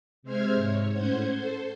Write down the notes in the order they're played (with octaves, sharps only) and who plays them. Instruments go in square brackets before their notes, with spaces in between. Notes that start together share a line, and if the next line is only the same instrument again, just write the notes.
[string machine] C3 G#3 C5 E5 F6 G#6
G#2 C#5
A2 C#4 C5 F#5 G6 G#6
A4 C5